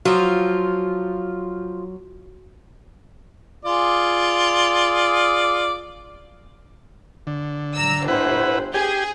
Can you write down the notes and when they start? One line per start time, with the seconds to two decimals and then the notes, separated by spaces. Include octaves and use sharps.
0.05 F3 F#3 F4 F#4
3.65 F4 G#4 D5
7.27 D3
7.76 A#5 E6
8.08 G1 E4 B4 C5 F#5
8.74 G4 G#4 G#5